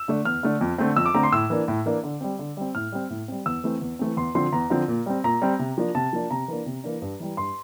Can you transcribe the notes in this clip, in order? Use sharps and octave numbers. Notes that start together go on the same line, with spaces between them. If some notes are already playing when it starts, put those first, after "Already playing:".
Already playing: E6
D3 A3 D4
E2 F6
D3 A3 D4
F2
D3 A3 C4
F2 E6
D6
D3 A3 C4 A#5
C6
A2 E6
E3 A#3 D4
A2
E3 A#3 D4
D3
G3 C4
D3
G3 C4
A2 F6
G3 C4
A2
G3 C4
E2 E6
E3 A3 C4
E2
E3 A3 C4
E2 C6
D3 F3 C4 C6
E2 A#5
D3 F3 C4
A#2
G3 C4
A#2 A#5
G3 C4
C3
F3 A#3 D4
C3 A5
F3 A#3 D4
C3 A#5
E3 A#3 D4
C3
E3 A#3 D4
G2
E3 G3
G2 C6